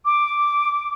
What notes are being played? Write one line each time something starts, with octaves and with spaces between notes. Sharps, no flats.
D6